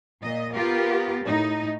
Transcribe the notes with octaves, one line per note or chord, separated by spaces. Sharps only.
A#2 D#5
B3 F4 G4 A#4
A2 D#4